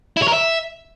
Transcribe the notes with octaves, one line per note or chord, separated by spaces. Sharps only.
E4
C#5
A#4
E5